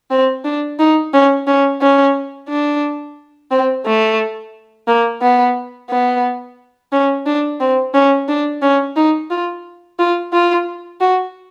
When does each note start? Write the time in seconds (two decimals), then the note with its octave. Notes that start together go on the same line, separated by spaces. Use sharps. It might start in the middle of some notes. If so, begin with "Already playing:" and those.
0.11 C4
0.45 D4
0.79 D#4
1.13 C#4
1.47 C#4
1.81 C#4
2.49 D4
3.51 C4
3.86 A3
4.88 A#3
5.22 B3
5.90 B3
6.92 C#4
7.26 D4
7.60 C4
7.94 C#4
8.29 D4
8.62 C#4
8.96 D#4
9.31 F4
9.99 F4
10.33 F4
11.01 F#4